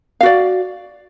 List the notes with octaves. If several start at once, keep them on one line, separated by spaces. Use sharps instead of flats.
F#4 D5 F5